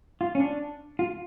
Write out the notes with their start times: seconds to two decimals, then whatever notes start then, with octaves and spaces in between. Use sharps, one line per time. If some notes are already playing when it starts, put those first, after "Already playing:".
0.21 F4
0.35 C#4
0.40 D4
0.99 F4